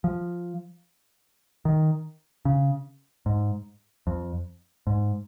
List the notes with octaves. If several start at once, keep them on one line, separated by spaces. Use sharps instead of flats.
F3
D#3
C#3
G#2
F2
G#2